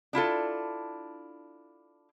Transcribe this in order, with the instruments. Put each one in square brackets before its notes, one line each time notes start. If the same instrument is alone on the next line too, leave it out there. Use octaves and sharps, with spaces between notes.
[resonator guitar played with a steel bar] D4 E4 F4 A4